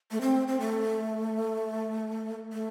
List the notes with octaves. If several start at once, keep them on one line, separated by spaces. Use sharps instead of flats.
A3
C4
C4
A3
A3